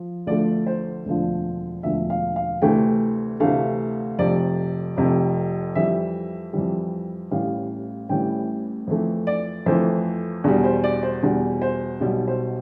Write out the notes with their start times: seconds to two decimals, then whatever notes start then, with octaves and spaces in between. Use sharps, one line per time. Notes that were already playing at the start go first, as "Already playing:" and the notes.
Already playing: F3
0.27 D2 D3 F3 A3 D5
0.67 C5
1.05 E1 D2 D3 F3
1.83 E1 D2 D3 F3 E5
2.10 F5
2.36 F5
2.62 D2 C3 E3 A3 G5
3.40 D2 C3 E3 A3 F5
4.19 F1 F2 C3 D5
4.97 F1 F2 C3
5.75 F2 E3 G3 E5
6.53 F2 E3 G3
7.31 A1 A2 E3 G3 F5
8.09 A1 A2 E3 G3 G5
8.87 F2 E3 A3
9.27 D5
9.66 F2 E3 A3 C5
10.44 E2 B2 G3
10.64 C5
10.84 D5
11.03 C5
11.23 E2 B2 G3
11.62 C5
12.00 B1 B2 G3 D5
12.28 C5